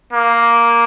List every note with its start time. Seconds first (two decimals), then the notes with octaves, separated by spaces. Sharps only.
0.13 A#3